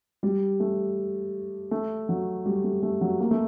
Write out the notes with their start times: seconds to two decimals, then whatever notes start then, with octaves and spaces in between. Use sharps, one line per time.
0.23 G3
0.60 A3
1.71 A3
2.09 F#3
2.46 G3
2.64 A3
2.83 A3
3.01 F#3
3.20 A#3
3.31 A3